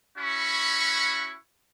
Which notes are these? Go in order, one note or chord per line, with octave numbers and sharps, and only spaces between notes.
C#4 E4 F#4 B5 C#6